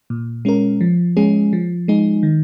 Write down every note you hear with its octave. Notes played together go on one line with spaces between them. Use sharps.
A#2
G#3 C#4 A#4
F3
G#3 C#4 G#4
F3
G#3 D#4 G#4
D#3